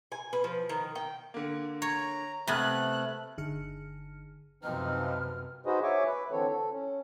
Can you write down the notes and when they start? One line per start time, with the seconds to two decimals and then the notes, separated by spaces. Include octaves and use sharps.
0.12 G#5
0.33 B4
0.44 F3
0.69 D#3
0.95 G5
1.34 D3 A#3
1.82 C#5 A#5
2.47 C3 A3 B3 F6 F#6 G#6 A6
3.38 G1 D3 D#4 G#4 F6 C#7
4.63 F#2 C3 F3 C4 D#4 B4 F6
5.66 D#4 F#4 G#4 B4 C5 D#5
5.83 C#5 E5 G#5 C#6 D6
6.06 B4
6.31 D3 E3 C4 A4 C#5
6.48 A4
6.73 C#4